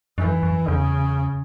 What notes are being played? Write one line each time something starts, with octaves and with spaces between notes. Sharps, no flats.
F#2 E3
F#2
E2 C#3